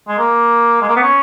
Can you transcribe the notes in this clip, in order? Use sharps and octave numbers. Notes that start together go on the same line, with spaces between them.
G#3
A#3
G#3
A#3
B3
C#4